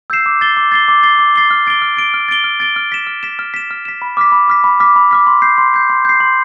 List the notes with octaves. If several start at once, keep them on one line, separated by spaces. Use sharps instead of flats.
E6 G6 C7 E7
D6
A6 C7 G7
D6
A6 C7 G7
D6
A6 C7 G7
D6
A6 C7 G7
F6
A6 D7 G7
F6
A6 D7 G7
F6
A6 D7 G7
F6
A6 D7 G7
F6
B6 E7
F6
B6 E7
F6
B6 E7
F6
B6 E7
B5
D6 F6 B6
B5
D6 F6 B6
B5
D6 F6 B6
B5
D6 F6 B6
C6
G6 C7
C6
G6 C7
C6
G6 C7
C6